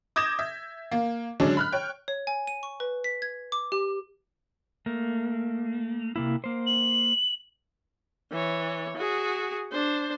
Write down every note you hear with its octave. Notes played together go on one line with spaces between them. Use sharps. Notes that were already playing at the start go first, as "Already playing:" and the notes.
D6 D#6 G6 G#6 A#6 E7
E5
A#3
D3 F#3 G#3 C#4 D4
B5 F6 F#6
C#5 G5
C#5
G#5
D#7
C#6
B4
B6
G#6
D6
G4
A3 A#3
C3 A#3 E4
A#3 C5
F#7
E3 C#5
F#4 G#4
D4 C5